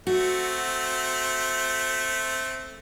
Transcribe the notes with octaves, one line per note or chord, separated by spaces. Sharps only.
A3 C4 F#4